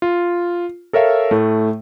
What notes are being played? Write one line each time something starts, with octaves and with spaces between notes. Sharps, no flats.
F4
A4 A#4 C#5 E5 F5
A2 A3